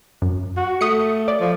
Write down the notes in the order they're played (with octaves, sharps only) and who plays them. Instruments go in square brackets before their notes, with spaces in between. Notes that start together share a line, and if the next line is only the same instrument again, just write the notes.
[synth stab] F#2
[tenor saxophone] F#4
[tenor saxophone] A3 [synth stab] D#6 C#7
[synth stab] D5
[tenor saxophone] F3